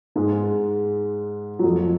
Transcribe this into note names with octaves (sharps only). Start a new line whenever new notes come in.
G#2 G#3
F#3
F2 F3